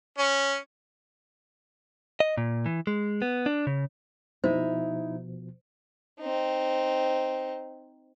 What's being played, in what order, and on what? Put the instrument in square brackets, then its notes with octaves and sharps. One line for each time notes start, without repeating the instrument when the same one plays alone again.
[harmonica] C#4
[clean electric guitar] D#5
A#2
E3
G#3
B3
D4
C#3
[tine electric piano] B2 F3 [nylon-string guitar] D#4 E4 [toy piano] C5
[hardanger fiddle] C4 D#4